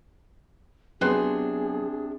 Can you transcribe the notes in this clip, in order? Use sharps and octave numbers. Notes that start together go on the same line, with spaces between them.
C3 F#3 B3 D4 G#4 B4 G5 C6